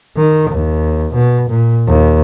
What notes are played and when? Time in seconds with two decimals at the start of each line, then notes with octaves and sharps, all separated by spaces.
0.17 D#3
0.50 D#2
1.14 B2
1.49 A#2
1.88 D#2